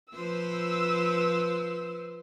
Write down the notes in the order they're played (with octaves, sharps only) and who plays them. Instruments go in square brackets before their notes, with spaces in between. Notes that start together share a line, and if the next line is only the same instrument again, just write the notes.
[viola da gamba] F3 B4 C5 [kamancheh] E6